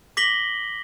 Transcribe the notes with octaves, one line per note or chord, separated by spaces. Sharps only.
D6 A#6 B6 F#7 G7